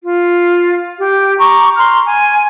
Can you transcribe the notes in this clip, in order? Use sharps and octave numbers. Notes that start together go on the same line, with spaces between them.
F4
G4
A#5 C#6 D6
A#5 C6 F6
G#5